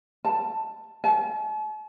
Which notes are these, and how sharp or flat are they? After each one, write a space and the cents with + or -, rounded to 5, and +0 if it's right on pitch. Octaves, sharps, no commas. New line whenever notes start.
A5 +5
A5 -45